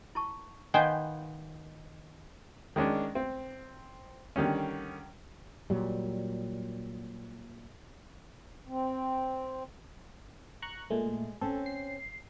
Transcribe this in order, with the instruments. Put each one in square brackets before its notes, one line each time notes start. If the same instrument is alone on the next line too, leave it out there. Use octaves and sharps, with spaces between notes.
[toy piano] E4 A5 C#6
[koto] D#3 B3 C5 [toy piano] D#5 F5 [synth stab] G5 G#5 G6
[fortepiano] D#3 G#3 C#4 D4
C4
D3 D#3 G3 C#4
[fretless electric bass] A#2 F#3 G3
[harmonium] C4
[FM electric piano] A#5 C#6 F#6
[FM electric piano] A#2 A3 [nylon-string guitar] G#3
[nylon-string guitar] C4 C#4 [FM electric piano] A4
[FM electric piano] C7